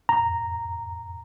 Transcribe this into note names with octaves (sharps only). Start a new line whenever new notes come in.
A#5